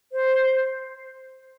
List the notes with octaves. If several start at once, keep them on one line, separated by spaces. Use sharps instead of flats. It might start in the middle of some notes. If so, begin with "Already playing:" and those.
C5